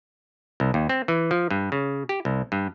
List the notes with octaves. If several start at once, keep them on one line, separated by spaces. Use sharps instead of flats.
C2
D#2
C4
E3
F3
G2
C#3
G4
C2
G2